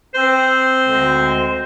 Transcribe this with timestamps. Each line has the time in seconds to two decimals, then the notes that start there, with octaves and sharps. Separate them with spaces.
0.15 C4 C5
0.85 D2 D3 G#3